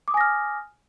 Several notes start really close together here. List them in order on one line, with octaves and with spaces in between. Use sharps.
D6 D#6 G#5 A#6 F6